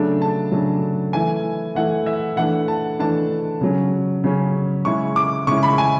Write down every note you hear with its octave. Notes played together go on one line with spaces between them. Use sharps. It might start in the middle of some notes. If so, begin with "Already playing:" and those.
Already playing: C#3 F#3 A3 D4
A5
C#3 F#3 A3 D4
E3 A3 E4 G#5
E3 A3 E4 F#5
E5
E3 A3 D4 F#5
A5
E3 A3 D4 A5
C#3 F#3 C#4
C#3 F#3 C#4
C#3 G#3 C#4 E4 C#6
D6
C#3 G#3 C#4 E4 C#6
B5
G#5